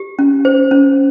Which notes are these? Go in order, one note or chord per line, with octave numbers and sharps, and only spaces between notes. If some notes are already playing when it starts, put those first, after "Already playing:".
Already playing: G4
C#4
C5
C#4